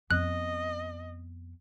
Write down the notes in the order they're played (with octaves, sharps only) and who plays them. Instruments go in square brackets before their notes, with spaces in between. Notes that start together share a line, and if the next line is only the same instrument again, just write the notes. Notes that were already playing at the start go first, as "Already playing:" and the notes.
[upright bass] F2 B3 [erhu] D#5 [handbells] F#6